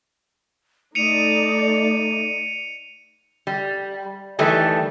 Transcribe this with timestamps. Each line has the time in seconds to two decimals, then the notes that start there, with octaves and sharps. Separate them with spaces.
0.95 A3 D#4 D5 C#7 D#7 F7
3.47 G3
4.39 D#3 E3 G3 A3